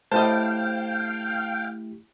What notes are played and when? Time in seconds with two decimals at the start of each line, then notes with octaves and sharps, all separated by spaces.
0.12 A3 E4 G4 C5 D#5 F5 G5 A5